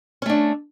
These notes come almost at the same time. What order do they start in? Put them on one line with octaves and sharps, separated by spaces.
C#4 A3 D4